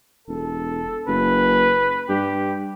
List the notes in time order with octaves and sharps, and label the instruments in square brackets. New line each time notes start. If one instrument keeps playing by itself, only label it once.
[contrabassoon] E1 [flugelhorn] A4
[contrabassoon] F#1 [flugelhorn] B4
[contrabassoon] G2 [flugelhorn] G4